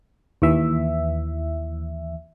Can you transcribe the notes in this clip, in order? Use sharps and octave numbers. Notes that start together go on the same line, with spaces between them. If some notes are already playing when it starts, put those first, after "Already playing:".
D#2 E3 E5